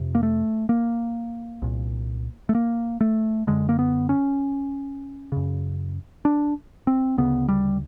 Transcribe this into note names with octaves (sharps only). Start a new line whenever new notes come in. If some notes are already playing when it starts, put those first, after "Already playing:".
Already playing: F2 C3
A#3
A3
A#3
C2 A#2
A3
A#3
A3
F#2 D3 G#3
A#3
B3
C#4
F#2 C#3
D4
C4
D2 C#3 B3
G3